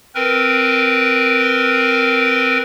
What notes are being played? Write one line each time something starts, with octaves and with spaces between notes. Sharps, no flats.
C4 A#4 B4